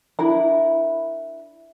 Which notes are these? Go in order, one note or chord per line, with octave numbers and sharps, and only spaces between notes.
D4 E4 A#4 B5